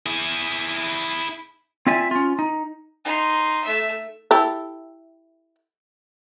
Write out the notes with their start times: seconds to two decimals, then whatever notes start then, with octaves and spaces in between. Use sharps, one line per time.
0.06 E4 G#4
1.87 C4 F4 D5 E5 G#5
2.11 C#4 F4
2.39 D#4
3.05 D#4 C6
3.64 A3 E5
4.31 E4 G4 A4